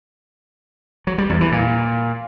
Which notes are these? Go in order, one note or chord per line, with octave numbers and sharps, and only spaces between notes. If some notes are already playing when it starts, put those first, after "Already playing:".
F#3
G3
E2
E3
A#2